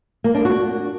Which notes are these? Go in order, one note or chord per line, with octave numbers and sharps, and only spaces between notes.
A#3
D4
F#4